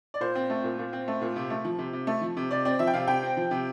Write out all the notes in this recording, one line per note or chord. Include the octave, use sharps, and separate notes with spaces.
D5
A#2 C5
C4
A3
A#2
A#2
C4
A3
A#2
C3
A3
F3
C3
C3
A3
F3
C3
C3 D5
C4 D5
F3 E5
G5
C3 F5
C3 G5
C4
F3
C3